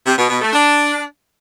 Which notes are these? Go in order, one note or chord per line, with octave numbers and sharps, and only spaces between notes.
C3
B2
B2
A3
D4